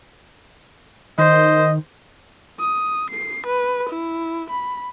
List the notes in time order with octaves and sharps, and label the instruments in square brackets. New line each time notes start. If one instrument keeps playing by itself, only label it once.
[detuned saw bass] D#3 [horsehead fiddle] C5 [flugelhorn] D#5
[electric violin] D#6
C7
B4
E4
B5